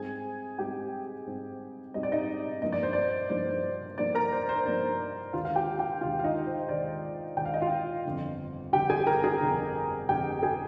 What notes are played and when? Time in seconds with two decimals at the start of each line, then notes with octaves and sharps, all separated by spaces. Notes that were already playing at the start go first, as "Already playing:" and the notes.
Already playing: G#2 G3 C4 G#4 G#5
0.58 G#2 G3 C4 G4 G5
1.26 G#2 G3 C4
1.94 G#2 G3 C4 D#5
2.03 D5
2.12 D#4 D#5
2.62 G2 F3 A#3 D#4 D#5
2.72 D5
2.83 C5
2.93 D5
3.30 G2 F3 A#3 D#4 C5
3.98 G2 F3 A#3 D#4 D5
4.15 A#4 A#5
4.32 C5
4.49 C5
4.66 G2 F3 A#3 D#4 D5
5.33 D#2 D3 G#3 F4 F5
5.45 F5
5.56 G4 G5
5.79 G4 G5
6.01 D#2 D3 G#3 F4 F5
6.19 F5
6.24 D#4 D#5
6.47 C5
6.69 D#2 D3 G#3 D5
7.37 D#2 D3 G#3 G5
7.45 F5
7.54 D#5
7.62 F4 F5
8.05 G1 F2 D3
8.72 G1 F2 D3 G4 G5
8.90 G#4 G#5
9.07 A#4 A#5
9.24 G#4 G#5
9.41 G1 F2 D3
10.08 G1 F2 D3 G4 G5
10.43 G#4 G#5